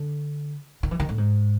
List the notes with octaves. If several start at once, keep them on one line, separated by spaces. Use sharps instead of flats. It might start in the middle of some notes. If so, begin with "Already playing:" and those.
Already playing: D3
D#3
E3
D#3
A2
G#2